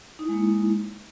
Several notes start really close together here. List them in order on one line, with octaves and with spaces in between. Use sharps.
D#4 E4 G#3 A#3